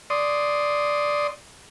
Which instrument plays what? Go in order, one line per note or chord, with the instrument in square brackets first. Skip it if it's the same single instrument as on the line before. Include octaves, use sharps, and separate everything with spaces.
[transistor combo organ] D5 C6 D#6